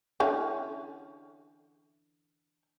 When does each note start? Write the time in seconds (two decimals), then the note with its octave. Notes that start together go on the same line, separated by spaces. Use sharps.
0.20 D3 E3 C#4